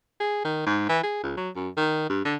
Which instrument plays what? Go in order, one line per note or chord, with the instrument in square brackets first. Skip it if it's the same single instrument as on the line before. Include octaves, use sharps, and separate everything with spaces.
[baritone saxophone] G#4
D#3
G#2
E3
G#4
C#2
F#3
F#2
D#3
G2
D3